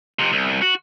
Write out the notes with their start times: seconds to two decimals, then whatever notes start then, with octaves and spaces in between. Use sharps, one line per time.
0.19 F2 C3
0.33 C2
0.62 F#4